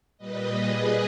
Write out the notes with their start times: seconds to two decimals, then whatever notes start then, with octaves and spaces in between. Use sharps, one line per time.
0.18 A#2 G3 B4 D#5
0.55 G#4 B4